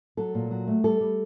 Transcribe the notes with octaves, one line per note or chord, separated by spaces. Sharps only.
F#3 A4
A#2
F#3
A3
G3 A4
G3